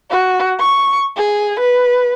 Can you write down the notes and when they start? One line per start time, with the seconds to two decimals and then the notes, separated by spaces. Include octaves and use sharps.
0.10 F#4
0.60 C#6
1.17 G#4
1.60 B4